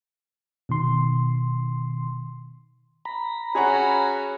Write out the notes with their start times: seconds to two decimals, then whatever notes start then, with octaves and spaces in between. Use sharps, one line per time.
0.69 B2 D#3 C6
3.05 A#5 B5
3.55 C#4 F#4 G#4 C#5 F#5